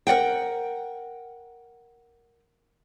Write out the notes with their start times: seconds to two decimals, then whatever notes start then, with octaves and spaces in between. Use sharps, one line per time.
0.07 A#4 D5 F#5 G5